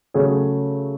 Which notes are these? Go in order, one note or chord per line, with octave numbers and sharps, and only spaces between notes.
C#3 F#3 A3 G#4